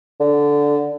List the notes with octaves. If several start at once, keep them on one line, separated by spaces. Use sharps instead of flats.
D3